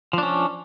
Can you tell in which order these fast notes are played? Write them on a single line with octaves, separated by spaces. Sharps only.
F3 D4 C#4